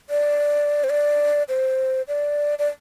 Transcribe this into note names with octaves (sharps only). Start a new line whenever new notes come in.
D5
C5
D5
C5
D5
D5